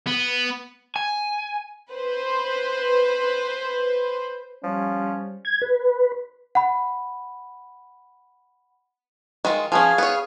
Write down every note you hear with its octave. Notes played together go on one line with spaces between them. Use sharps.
B3
G#5
B4 C5
F3 G3 C#4
G#6
B4
F#5 B5
D#3 G#3 F4
F3 B3 C#4 G#4 F5 G#5
B3 C#5